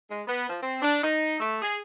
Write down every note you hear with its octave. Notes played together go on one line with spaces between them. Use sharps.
G#3
B3
F3
C4
D4
D#4
A3
G#4